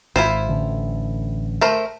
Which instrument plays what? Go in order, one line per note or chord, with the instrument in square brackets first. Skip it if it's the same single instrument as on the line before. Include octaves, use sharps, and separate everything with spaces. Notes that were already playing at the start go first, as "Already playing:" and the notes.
[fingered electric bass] G#1 [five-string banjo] E4 F4 C5
[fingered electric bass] A1 D3
[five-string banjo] A3 A#4 C5